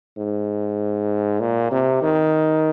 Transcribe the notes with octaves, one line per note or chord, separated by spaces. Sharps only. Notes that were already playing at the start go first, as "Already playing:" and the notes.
G#2
A#2
C3
D#3